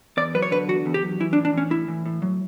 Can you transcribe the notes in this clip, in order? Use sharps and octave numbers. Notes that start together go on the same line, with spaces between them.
E2 D5
F#3 B4
C#5
D3 B4
E2 F#4
E2
G4
F#3
E3 E4
D4
A2
D4
E3 C#4
A2 E4
E3
A2
F#3